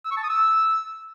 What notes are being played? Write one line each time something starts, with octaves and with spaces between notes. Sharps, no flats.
E6
C#6
A5
D#6
E6